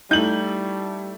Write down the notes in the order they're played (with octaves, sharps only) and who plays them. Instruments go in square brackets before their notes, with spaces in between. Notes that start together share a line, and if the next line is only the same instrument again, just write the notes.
[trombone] G3 [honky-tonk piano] A3 E4 [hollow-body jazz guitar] D#4 [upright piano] G6 F#7